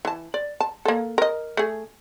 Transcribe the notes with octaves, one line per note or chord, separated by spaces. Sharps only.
E3 A5
D5
A5
A#3 A4
A#4 D#5
A3 G#4